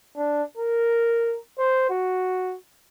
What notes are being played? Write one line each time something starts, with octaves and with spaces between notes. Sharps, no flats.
D4
A#4
C5
F#4